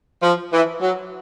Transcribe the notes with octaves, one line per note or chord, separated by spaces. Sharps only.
F3
E3
F#3